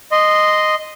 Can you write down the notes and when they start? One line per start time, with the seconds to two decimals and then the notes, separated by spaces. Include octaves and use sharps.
0.12 D#5 C6